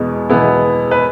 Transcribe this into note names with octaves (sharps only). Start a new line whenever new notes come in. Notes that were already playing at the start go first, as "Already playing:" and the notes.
Already playing: E2 B2 G#3 B3
E2 B2 G#3 B3 E4
B4